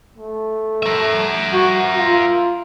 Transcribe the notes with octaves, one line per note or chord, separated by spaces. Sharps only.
A3
A#4 E5
F#4
F4